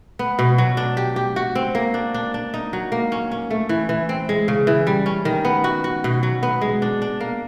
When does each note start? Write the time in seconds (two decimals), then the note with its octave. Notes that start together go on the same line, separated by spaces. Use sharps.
0.19 B3
0.39 B2
0.58 F#3
0.77 D4
0.97 G4
1.16 G4
1.36 F#4
1.55 C4
1.75 A#3
1.94 D4
2.14 D4
2.34 D4
2.54 D#4
2.73 F#3
2.92 A#3
3.12 C#4
3.31 C#4
3.51 A3
3.69 E3
3.89 E3
4.09 C4
4.29 G#3
4.48 C#3
4.67 E3
4.87 G3
5.06 C#4
5.25 D#3
5.45 B3
5.64 F#4
5.84 F#4
6.04 B2
6.23 F#3
6.43 B3
6.62 G#3
6.82 D4
7.02 D4
7.21 A#3